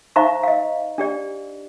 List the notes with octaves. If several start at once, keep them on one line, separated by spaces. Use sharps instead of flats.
D#4 C5 E5 F5 A#5 C#6
D#5 F5
D4 G4 D5